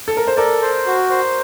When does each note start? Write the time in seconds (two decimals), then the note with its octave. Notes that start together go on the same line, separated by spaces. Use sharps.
0.08 A4
0.17 A#4
0.27 C5
0.37 A4 A#4 D5
0.62 C5
0.86 F#4
1.10 C5